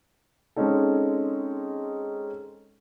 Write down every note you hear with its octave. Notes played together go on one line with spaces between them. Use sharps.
G#3 C4 C#4 D#4 A4